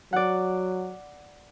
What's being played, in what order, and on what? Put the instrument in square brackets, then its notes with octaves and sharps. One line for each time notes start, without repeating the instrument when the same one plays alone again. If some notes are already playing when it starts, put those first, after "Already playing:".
[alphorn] F#3 [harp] D5 F#5